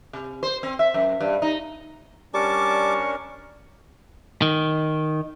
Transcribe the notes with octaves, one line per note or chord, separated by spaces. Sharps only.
C3
C5
C4
E5
F#2
G2
D#4
G3 C#4 D4 A#4 A5 C#6 D6
D#3